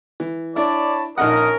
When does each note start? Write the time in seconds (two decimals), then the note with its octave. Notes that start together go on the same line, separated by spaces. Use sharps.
0.20 E3
0.56 D4 E4 C#5 D5 A5 B5
1.18 A#1 C#4 D#4 A#4 D#5 F#5